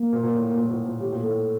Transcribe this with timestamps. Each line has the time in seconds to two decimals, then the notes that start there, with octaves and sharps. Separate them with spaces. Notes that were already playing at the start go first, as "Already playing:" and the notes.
Already playing: A#3
0.13 A#2
0.23 A#2
0.34 A2
0.56 A#2
0.65 A2
0.71 A#2
0.86 A#2
1.00 A2 G4
1.12 A#2
1.22 A2 A4